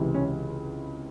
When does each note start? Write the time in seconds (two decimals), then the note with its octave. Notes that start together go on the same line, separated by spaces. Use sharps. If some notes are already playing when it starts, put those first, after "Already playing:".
Already playing: C#2 C3 E3
0.14 C#4